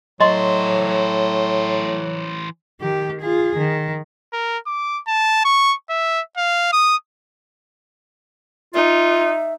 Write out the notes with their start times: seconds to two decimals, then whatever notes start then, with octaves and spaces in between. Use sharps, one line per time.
0.20 A2 E3 F#3 C5 D#5 C6
2.81 D#3 G4
3.22 F4 G#4
3.58 D#3
4.33 A#4
4.67 D6
5.07 A5
5.45 C#6
5.90 E5
6.37 F5
6.73 D#6
8.75 D#4 F4 E5